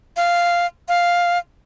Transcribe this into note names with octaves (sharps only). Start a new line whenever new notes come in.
F5
F5